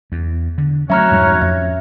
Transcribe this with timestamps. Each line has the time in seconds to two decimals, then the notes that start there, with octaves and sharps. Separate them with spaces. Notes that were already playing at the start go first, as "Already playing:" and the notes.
0.12 E2
0.58 D3
0.90 F#3 A3 C#4 F#4 C#5 E5 A#5 F6
1.11 F2 G#2 G3
1.42 F2 E5